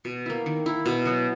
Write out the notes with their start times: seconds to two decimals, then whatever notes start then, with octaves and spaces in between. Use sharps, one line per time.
0.05 B2
0.26 A#3 E4
0.46 D#3
0.66 A#3 E4
0.86 B2
1.05 F#3 B3